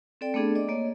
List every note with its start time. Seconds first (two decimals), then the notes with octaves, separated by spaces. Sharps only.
0.21 C4 A4 D5 G5
0.34 A3 B3 D4 G#4 A4
0.55 D5 D#5 D6
0.69 A#3 C#5 D#5